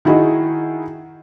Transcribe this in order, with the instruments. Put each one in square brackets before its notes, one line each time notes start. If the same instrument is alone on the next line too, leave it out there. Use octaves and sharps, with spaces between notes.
[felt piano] D#3 E4 F#4 G#4 D#5